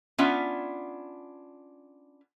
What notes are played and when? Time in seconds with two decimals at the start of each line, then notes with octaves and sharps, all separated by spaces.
0.18 B3 C#4 D4 F4 E5